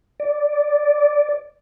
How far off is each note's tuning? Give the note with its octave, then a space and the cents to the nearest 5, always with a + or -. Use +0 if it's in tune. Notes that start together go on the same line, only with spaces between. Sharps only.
D5 -5